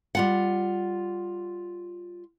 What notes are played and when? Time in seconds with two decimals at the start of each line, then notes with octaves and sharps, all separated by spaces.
0.15 G3 F4 F#5